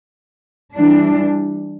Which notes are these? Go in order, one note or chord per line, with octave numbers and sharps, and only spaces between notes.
E3 G3 D4